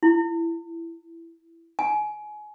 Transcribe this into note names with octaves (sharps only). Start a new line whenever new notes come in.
E4
G#5